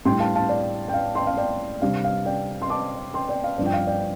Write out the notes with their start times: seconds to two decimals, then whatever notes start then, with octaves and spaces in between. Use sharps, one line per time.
0.05 A2 G3 D4 G5 C6
0.20 F5 A5
0.35 F5 A5
0.49 D5
0.88 G5
0.94 F5
1.15 G5 C6
1.27 F5
1.37 D5 G5
1.82 C3 G3 D4 F5
2.04 F5
2.25 D5 G5
2.62 C6
2.70 A5 D6
3.14 G5 C6
3.29 D5 G5
3.44 F5
3.58 G2 F3 D4 D5
3.65 G5
3.73 F5
3.87 D5 G5